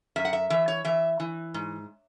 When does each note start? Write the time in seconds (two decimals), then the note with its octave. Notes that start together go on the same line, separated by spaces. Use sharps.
0.16 F#2 E5
0.25 F#5
0.33 E5
0.50 E3 E5
0.68 C#5
0.85 E3 E5
1.20 E3
1.54 G#2